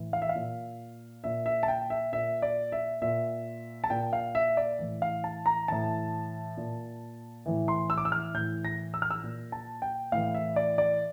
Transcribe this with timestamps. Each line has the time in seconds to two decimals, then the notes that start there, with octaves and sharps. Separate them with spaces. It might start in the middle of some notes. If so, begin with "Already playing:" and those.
Already playing: A2 E3
0.13 F5
0.22 E5
0.29 F5
0.35 A#2
1.24 A#2 E5
1.46 E5
1.63 A5
1.68 G5
1.90 E5
2.12 A#2 E5
2.42 D5
2.72 E5
3.02 A#2 E5
3.84 A5
3.90 A#2 G5
4.13 F5
4.35 E5
4.57 D5
4.79 A2 E3
5.02 F5
5.24 A5
5.46 A#5
5.68 A2 E3 A5
6.57 A#2
7.46 A2 E3
7.68 C6
7.90 E6
7.98 D6
8.05 E6
8.12 F6
8.34 A2 E3 G6
8.65 A#6
8.94 E6
9.02 F6
9.11 E6
9.23 A#2
9.52 A5
9.82 G5
10.12 A2 E3 F5
10.35 E5
10.56 D5
10.78 D5